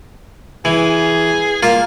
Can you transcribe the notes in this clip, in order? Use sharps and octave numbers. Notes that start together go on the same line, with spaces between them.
E3 G#4
A#3 F4